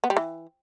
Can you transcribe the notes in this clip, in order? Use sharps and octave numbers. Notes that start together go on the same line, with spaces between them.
B3
G3
E3